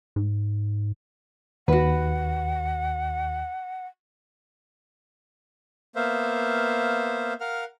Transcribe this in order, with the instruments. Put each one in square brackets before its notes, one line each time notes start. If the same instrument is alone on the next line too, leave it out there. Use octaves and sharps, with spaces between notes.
[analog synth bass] G#2
[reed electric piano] D#2 [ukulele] F#4 B4 [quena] F#5
[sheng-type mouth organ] A#3 B3 C5 E5 F5
A#4 F5 F#5 F6